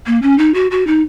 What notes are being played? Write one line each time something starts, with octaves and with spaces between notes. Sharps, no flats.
A#3
C#4
D#4
F#4
F#4
D#4